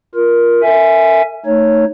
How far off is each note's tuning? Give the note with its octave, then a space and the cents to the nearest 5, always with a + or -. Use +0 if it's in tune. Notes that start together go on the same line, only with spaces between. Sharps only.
F4 +0 A#4 +15
A#4 -45 E5 +0 G#5 +0
A3 +20 D#4 -5 C#5 +0